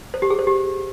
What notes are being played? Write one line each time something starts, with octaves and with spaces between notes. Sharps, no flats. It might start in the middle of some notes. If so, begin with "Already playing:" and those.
C5
G4
G#4
C5
G4